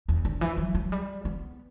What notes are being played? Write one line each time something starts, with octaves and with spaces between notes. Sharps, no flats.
E2
D3
E3
F#3
F#3
G3
B3